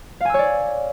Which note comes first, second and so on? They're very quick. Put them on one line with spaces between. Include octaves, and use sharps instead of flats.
F5 G#5 E6 C#5 D5